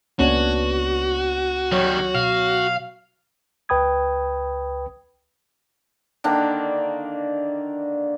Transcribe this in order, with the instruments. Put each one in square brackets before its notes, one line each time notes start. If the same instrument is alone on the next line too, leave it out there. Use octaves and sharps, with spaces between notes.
[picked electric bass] C#2 A#3 C#4 [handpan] B3 D4 C#5 [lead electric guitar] F#4
[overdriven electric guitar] D#3 G3 [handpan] F#3 C#5
[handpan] B2 [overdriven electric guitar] F5
[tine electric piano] C#2 B4 G5 B5 D#6 G#6
[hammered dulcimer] D3 D#3 A#3 D4